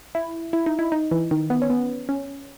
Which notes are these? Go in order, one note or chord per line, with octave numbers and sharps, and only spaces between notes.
E4
E4
D#4
E4
D#4
E3
D#3
B3
C#4
B3
C#4